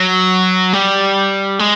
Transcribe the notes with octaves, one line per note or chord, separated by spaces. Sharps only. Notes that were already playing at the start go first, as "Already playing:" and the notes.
Already playing: F#3
G3
G#3